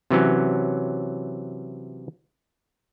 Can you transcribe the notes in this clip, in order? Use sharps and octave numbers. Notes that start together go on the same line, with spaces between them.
C3 E3 F#3 C#4